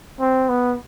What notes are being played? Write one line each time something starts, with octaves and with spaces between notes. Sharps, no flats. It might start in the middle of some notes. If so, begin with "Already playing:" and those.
C4
B3